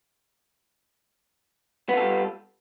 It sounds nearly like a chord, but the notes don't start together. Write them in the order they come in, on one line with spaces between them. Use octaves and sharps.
B3 F4 A4 G3